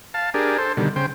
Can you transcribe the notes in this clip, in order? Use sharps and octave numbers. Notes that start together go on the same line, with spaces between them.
F5 A5
D4 G4 G#4 A#4
A4 C5
B2 D3 D#3 G3
C#3 C5 G5